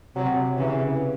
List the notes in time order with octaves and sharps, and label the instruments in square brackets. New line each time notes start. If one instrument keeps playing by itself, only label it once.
[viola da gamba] C3 [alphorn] F#3
[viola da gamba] C#3 [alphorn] E3